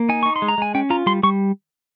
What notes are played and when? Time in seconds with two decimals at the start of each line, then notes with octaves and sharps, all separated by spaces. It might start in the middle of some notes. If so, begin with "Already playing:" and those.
Already playing: A#3
0.09 D#4 G#5
0.23 D#4 C#6
0.36 C6
0.42 G#3
0.48 A#5
0.58 G#3 G#5
0.74 C#4 G5
0.90 F4 A#5
1.06 G3 C6
1.23 G3 C#6